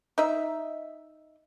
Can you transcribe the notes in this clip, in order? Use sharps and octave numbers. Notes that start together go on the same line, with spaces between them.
D#4 E5